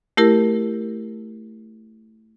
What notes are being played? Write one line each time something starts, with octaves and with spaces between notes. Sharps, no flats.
A3 E4 G4 A#4